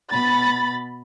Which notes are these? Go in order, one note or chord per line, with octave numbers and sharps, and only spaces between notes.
B2 B5 A6